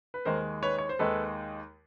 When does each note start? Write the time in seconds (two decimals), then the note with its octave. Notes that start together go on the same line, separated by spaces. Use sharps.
0.14 B4
0.25 D#2 D#3 G#3 A#4 C5
0.63 B4 C#5
0.78 C#5
0.89 C5
0.99 D#2 D#3 G#3 A4 B4